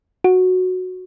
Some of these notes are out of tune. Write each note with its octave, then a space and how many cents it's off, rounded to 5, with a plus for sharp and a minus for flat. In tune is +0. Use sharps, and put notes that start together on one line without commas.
F#4 -5